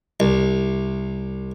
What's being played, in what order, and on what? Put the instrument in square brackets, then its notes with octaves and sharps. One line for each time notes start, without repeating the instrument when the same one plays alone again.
[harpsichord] C2